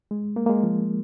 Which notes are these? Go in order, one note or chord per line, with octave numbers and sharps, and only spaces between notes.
G#3
A#3
A#3
G#3
F3